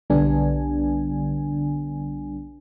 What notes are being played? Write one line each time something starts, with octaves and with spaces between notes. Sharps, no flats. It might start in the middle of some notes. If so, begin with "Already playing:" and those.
B1 D3 G3 B3 D4 G#5